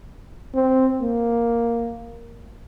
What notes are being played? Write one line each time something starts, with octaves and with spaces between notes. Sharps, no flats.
C4
A#3